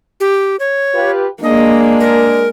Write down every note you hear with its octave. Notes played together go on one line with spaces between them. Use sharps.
G4
C#5
F4 G4 B4
G#3 A#3 D4 D#5
A#4